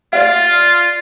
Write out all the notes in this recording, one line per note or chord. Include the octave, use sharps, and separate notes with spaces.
F4 D5 F5